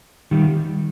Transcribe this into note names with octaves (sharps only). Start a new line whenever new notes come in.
D#3 G3